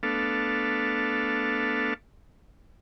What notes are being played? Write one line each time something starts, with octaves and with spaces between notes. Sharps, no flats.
A3 B3 D4 A4 F5